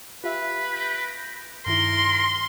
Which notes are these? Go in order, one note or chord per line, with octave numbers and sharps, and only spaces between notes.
F4 G4 B4 E5
G6 A#6 D7
G2 D#3 E4 A#4 C6